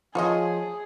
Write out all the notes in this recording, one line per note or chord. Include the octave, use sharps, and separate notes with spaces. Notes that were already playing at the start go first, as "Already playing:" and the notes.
F3 F4 G#4 C#5 D#5